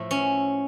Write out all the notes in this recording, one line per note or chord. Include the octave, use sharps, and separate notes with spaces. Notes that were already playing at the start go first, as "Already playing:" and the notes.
Already playing: A2 F3 A3
C#4